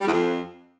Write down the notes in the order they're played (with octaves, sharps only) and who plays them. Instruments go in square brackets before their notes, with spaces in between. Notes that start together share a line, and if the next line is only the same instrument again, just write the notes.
[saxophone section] G3
E2
F2